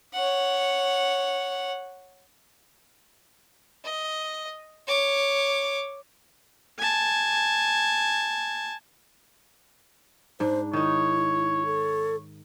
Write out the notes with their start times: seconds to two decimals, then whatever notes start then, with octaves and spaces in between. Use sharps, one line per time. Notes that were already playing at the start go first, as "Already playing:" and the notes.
0.14 C#5 F#5
3.85 D#5
4.87 C#5 D6
6.79 G#5 A5
10.40 G#2 D4 C5
10.73 D#3 D#4 E4 C#5
11.65 A4